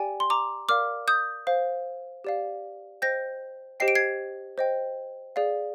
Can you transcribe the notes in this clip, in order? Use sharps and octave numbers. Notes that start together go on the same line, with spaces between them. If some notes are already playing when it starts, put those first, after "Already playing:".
Already playing: G4 D5 G5 G#5
C6
A#5 D6
A#4 D5 F5 D6 F6
D#6 G6
C5 F5
G4 D5 F5
C5 D#5 G5 G6 A#6
G4 C5 D#5 G5 C7
D7
G#6 C7
C5 D#5 G5
G#4 D5 F5